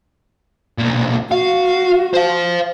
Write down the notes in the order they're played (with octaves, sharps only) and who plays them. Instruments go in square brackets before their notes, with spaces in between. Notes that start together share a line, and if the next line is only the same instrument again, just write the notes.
[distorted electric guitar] B1 A#2
[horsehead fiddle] F#4 [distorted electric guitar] F5
[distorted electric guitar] C5 F5